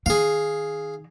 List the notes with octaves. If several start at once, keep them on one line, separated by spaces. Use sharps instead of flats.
D#3 G#4 F5